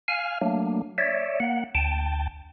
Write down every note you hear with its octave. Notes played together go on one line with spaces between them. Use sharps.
F5 G#5 F6
F#3 A3 A#3 D4
C#5 D5 E5
A#3 F#5
D2 G5 A5